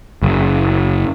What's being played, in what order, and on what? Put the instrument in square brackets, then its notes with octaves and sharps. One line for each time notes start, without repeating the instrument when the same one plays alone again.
[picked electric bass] F#1